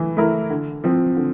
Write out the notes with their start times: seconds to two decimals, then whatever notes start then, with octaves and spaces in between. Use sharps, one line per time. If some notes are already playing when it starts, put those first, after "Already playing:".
Already playing: E3 A3 E4
0.17 A3 E4 A#4
0.50 D3
0.84 F3 C4
1.16 D3